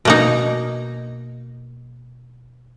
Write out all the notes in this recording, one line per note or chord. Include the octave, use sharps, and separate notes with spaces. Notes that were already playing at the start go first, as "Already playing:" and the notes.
B2 A#3 D#4